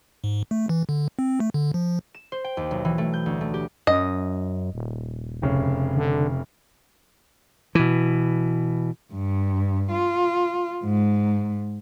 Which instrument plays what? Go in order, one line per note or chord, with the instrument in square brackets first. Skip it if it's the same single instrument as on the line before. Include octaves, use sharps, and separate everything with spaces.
[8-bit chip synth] G#2
A3
E3
D3
C4
A3
D3
F3
[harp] E7
C5
G5
D#2
B1
E3
A3
G6
D2
A3
G4
[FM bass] F#2 [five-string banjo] D#5
[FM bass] D#1
[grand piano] F1 C#3
[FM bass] D3
[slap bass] B2 E3
[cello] G2
F4
G#2